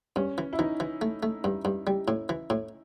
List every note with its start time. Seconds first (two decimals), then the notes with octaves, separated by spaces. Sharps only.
0.16 G2 C#4
0.38 E3
0.53 E4
0.59 E3 D#4
0.80 E3
1.01 A3
1.23 A3
1.44 G2
1.65 G2
1.87 G3
2.08 A2
2.29 E3
2.50 A2